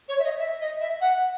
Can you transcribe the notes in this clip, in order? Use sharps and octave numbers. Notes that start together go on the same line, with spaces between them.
C#5
E5
D#5
E5
D#5
E5
F#5